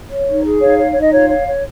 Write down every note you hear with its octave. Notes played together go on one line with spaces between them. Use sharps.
C#5
D#4
G#4
D#4 C#5 F5
C#5
D#4 C#5
D#5
F4 C#5 F5
C#5
C#5